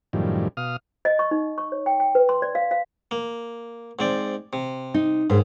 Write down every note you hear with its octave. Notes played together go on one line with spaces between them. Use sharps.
F#2 A2 D#3 F3 G3
B2 F5 D#6 F6
D#5
C#6
D#4
C#6
C#5
G5
G5
B4
C6
D5
F5
F5
A#3
G#2 C4 D5
C3
D#4
D#2 G#2